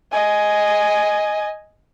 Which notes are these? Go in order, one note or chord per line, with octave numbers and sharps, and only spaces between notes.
D#5 G#5